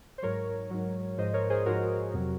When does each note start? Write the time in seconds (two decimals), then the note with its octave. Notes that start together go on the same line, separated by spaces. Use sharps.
0.18 C5
0.22 G#2 F#3 A#4 C#5
0.71 G#2 F#3
1.18 G#2 F3 C5 D#5
1.34 A#4 C#5
1.50 G#4 C5
1.66 G#2 F3 F#4 A#4
2.13 F2 C3 F#3